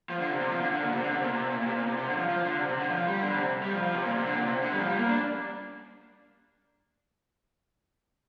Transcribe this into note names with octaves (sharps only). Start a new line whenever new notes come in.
F3
D3
C3
C3
F3
D3
D3
A#2
C3
D3
C3
A#2
C3
A#2
A#2
C3
A#2
C3
C3
D3
F3
F3
D3
C3
C3
D3
F3
G3
D3
C3
G3
F3
F3
C3
A#2
C3
D3
A#2
C3
D3
G3
F3
G3
A#3
D4